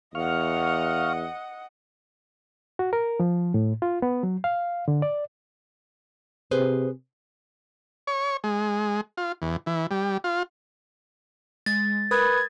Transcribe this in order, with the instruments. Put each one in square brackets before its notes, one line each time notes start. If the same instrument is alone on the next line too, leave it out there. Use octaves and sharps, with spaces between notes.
[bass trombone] E2 [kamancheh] D#5 F#5 [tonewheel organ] F5 C#6 F6
[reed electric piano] F#4
A#4
F3
A2
F4
B3
F#3
F5
D3
D5
[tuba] C3 [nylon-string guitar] G#4 B4 C5
[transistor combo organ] C#5
G#3
F4
E2
E3
G3
F4
[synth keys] G#3 [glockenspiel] A6
[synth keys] A#4 B5 D#6 [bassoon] B4 [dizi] G#6